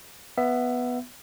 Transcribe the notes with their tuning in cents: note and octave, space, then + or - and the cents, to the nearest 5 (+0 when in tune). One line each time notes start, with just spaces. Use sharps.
B3 +0 E5 +15